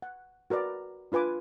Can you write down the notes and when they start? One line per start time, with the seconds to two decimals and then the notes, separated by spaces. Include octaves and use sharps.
0.02 F#5
0.50 F#4 A#4 B4 D5 A#5
1.12 D4 F4 B4 G#5 D6